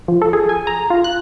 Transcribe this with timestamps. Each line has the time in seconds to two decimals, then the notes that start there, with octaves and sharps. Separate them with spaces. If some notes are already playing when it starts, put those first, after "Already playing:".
0.08 F3
0.22 A4
0.33 G#4
0.49 G#5
0.67 A#5
0.90 F4
1.04 F#6